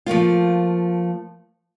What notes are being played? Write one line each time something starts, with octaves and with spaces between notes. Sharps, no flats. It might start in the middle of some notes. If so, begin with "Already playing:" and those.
F3 A3 A#3 F4